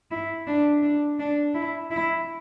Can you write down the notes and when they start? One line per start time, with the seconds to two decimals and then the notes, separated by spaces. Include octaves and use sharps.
0.11 E4
0.47 D4
0.82 D4
1.19 D4
1.54 E4
1.91 E4